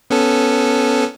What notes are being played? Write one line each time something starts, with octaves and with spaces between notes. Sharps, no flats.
B3 C#4 A4